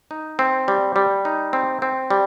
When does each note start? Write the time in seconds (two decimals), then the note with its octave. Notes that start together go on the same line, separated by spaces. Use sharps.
0.11 D#4
0.39 C4
0.68 G3
0.96 G3
1.25 D#4
1.53 C4
1.82 C4
2.10 G3